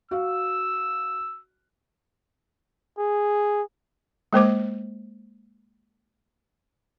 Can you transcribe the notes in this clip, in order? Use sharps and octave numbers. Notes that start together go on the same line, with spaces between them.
F#4 F5 E6
G#4
G#3 A#3 C5 D6